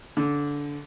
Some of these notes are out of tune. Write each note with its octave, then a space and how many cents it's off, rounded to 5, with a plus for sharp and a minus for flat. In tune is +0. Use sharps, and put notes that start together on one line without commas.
D3 -20